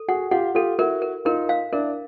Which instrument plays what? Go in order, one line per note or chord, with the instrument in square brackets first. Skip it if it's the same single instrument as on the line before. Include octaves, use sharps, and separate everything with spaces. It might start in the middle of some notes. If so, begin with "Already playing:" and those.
Already playing: [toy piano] A4
[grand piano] F#4 G#4 [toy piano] F#5
[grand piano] F4 G4 [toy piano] F#5
[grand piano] F4 G4 [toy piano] A4
[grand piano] E4 F#4 [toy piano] A#4
[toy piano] A#4
[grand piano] D#4 F4 [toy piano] A#4
[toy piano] F5
[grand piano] D4 E4 [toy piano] A#4